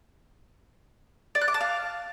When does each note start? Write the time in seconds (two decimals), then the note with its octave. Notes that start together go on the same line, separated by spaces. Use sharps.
1.35 D5
1.41 F#6
1.48 D6
1.54 A5
1.61 F5